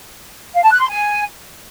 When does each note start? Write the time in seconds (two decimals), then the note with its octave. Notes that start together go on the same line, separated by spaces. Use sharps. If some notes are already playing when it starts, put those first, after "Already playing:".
0.55 F5
0.63 A5
0.72 F#6
0.80 C6
0.89 G#5